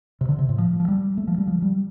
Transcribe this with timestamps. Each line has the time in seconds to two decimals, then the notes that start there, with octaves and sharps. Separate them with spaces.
0.21 C3
0.29 D3
0.39 C3
0.49 A2
0.58 F3
0.80 F3
0.88 G3
1.17 A3
1.28 F3
1.38 G3
1.48 F3
1.62 G3